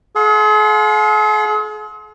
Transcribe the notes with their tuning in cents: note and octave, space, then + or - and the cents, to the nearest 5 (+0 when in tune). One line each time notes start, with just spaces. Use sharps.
G#4 +45 F5 +45 C6 -5